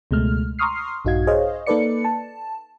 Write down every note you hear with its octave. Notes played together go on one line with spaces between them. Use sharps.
C#2 B2 G#3 A3 F6
A#5 C6 C#6 D#6 F6 C7
A#1 G2 D#4 F#4 F5 G#6
G#4 C5 C#5 D#5 F5
A#3 D#4 A4 B4 D5 C#7
A5